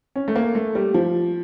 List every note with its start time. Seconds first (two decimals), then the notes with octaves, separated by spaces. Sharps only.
0.16 C#4
0.28 A3
0.36 A#3
0.55 A3
0.75 G3
0.94 F3